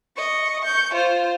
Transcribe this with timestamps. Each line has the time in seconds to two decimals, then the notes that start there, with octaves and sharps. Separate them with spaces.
0.17 D#5 C#6
0.62 C#6 G6
0.94 F4 C5